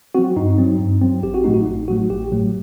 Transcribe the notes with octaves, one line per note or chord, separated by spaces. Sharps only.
F#3 C4 F#4
G2 D#4
F#3 C4
G2
F#3 C4
A1 G4
F#4
A2 F#3 A3 D#4
F#4
A1 D#4
A2 F#3 A3 F#4
A1 G4
A2 F#3 A3